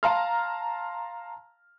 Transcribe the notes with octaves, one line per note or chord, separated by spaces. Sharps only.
F5 A5 A#5 C6 F6